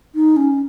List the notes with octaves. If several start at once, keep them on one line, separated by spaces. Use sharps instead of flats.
D#4
C#4